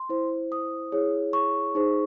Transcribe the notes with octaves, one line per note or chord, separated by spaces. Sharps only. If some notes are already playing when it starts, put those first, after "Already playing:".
Already playing: C6
E4 C5
D#6
E4 G#4 C#5
C#6
D#4 G#4 C5